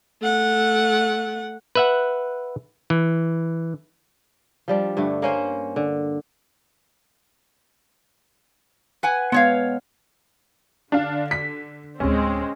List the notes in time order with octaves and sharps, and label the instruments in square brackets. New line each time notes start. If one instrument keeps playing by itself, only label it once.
[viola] A3 F#5
[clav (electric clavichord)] B4 E5 F#5
E3
[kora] F3 G3 D4
G2 D3 A3
A#3 C#4 C5
D3
[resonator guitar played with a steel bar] B4 F#5 G#5
[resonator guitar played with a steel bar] G#3 C#5 F5 [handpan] B3
[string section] D3 [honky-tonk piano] D4 F5
[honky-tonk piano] B6
[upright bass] D1 D2 [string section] G#3 C4 [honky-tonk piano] C#4